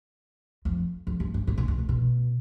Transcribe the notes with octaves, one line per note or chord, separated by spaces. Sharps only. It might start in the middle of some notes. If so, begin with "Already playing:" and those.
F2
F2
G2
G#2
A2
A#2
B2
C3
B2